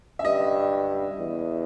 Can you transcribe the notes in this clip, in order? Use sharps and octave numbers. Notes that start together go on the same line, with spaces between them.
E5
G2 D#5
E2